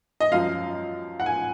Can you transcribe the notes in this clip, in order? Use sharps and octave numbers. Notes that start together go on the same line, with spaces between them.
D#5
F#2 F3 F5
F#5
G#5